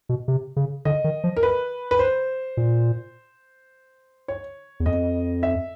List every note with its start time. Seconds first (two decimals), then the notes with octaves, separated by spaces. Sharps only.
0.09 B2
0.28 C3
0.56 C#3
0.85 D3 D#5
1.04 D#3
1.24 F3
1.37 A#4
1.43 B4
1.91 B4
1.99 C5
2.57 A#2
4.28 C#5
4.80 E2
4.86 F2 D#5
5.43 E5